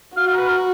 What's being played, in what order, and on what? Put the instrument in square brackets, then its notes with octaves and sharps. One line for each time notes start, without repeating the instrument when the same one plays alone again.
[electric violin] F#4 [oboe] F5
[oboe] F5
A#4
B4
A#4